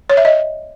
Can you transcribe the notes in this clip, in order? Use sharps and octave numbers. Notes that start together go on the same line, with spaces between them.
C#5
E5
D#5